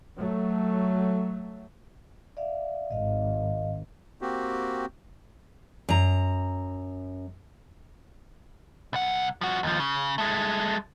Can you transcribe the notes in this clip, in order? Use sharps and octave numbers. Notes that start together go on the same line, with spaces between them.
F#3 A3
D5 E5 F5
G#1 D#5 F5
A#3 C4 F#4 G4
F#2 A#5
C2 F#5
F3 F#4
D#2 F3
C#3
G#3 A3